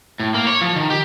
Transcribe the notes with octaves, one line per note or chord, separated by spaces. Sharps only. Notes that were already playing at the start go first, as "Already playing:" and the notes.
A2
A#3
C#5
F3
D#3
G4